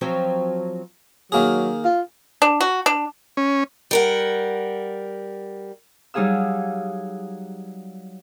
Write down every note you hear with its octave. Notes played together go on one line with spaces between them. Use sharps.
F3 F#3 C4
D#3 F#3 A#3 G#4
F4
D4
F#4
D4
C#4
G3 A#4 F#5
F#3 G3 D#4 G#4 F5 E6